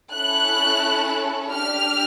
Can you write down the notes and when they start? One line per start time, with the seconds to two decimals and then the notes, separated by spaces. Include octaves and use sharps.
0.12 C#4 E4 A4 F#6
1.52 D4 G4 F6